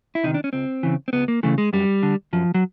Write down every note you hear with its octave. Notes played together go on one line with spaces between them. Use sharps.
E4
C3 D#3 D#4
D4
C#4
C#2 C4
C#3 E3
C4
C#2 B3
A#3
C#3 E3 A3
G#3
F#2 G3
D3
F#2 F3
F#3